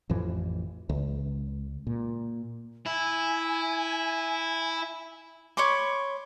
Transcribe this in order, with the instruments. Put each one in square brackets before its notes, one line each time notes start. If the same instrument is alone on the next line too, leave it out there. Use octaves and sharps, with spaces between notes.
[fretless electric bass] A1 F2 E3 F3
C#2
A#2
[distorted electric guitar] E4 [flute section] G#5
[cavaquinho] C#5 B5 C6 D6